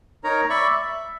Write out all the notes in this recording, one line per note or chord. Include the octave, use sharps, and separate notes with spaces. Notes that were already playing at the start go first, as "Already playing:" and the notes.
D#4 A#4 C#5 A#5
D5 E5 B5 C#6
E5